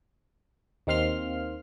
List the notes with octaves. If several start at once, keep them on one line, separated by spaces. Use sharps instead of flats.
D#2 D#3 C4 F5 C6 F6